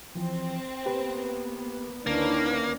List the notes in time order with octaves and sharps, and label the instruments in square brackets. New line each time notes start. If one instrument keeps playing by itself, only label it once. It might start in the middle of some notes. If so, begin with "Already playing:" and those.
[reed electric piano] E3 F3 [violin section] C4
[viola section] A#3 B3 [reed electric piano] G4 B4
[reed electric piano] D2 [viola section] D#3 C#4 E4 [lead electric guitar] A#3 [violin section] D4 B4